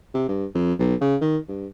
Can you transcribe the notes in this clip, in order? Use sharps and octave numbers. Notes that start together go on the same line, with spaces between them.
C3
G2
F2
B1
C#3
D#3
G2